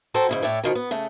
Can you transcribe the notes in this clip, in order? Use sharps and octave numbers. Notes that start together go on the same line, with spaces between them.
F#3 F#4 A4 C5 G5
G#2 C#3 E4
A2 C#5 D5 E5 G5
B2 D#3 F3
B3
C#3 A3